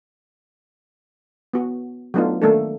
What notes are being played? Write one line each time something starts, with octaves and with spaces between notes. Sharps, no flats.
B3 F#4
F#3 A3 B3 D4 D#4 F4
D#3 A3 A#3 D4 A4